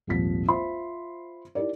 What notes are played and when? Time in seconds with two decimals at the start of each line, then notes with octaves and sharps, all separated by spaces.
0.07 D#1 G#1 F3 B6
0.48 F4 C5 E5 B5 C6
1.55 D#4 E4 G4 A#4 D5